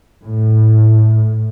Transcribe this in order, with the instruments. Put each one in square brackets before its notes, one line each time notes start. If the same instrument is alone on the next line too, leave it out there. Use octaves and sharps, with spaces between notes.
[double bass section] A2